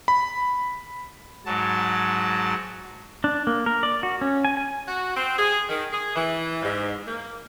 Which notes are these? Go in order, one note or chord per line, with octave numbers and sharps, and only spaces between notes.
B5
G#2 F#3 A5
D4
A#3
A#4
D5
F#4
C#4
G#5
G#5
F#4
C4
G#4
D#3
G#4
E3
G#2
A#3